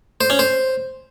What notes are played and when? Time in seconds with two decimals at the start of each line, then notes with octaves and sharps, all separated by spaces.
0.21 C5
0.30 C#4
0.39 C5